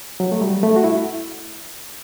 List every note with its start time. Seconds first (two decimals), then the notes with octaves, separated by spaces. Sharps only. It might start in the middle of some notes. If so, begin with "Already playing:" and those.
0.20 F#3
0.32 A3
0.41 G3
0.63 A3
0.76 F#4
0.84 E4